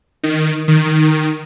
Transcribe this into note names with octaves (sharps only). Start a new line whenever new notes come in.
D#3
D#3